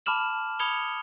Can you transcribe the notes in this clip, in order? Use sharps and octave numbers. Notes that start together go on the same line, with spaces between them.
A5 B5 D6 F6 E7 F#7
B5 D#6 G#6 C#7 F7 G7